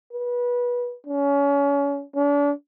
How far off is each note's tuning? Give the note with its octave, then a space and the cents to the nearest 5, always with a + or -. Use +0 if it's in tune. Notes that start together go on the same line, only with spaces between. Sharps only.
B4 -25
C#4 +30
D4 -40